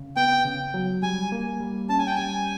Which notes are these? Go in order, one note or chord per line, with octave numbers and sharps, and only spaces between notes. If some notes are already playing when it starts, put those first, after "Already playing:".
Already playing: C#3
B3 G5
C#3
F#3
G3 G#5
A#3
G3
C#4 A5
G#5
G5
G3 G#5